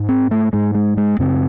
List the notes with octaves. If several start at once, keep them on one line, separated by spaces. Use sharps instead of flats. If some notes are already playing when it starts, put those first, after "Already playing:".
Already playing: G#2
C4
A3
G#2 G#3
G#3
G#3
F#2 C#3 C4